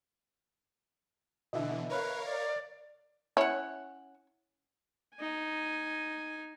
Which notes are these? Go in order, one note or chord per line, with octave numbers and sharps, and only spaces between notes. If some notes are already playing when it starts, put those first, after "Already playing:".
B2 D3 E3 D#5 E5
A#4 B4 C#5 F5
D5
C#4 E4 C#5 F#5
D#4 G#5